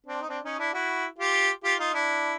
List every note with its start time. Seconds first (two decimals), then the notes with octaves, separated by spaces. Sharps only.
0.06 C4 D4
0.22 D#4
0.28 C4 D4
0.44 C#4 D#4
0.59 D4 E4
0.73 E4 F#4
1.18 F4 G4
1.64 F4 G4
1.79 D#4 F4
1.94 D4 E4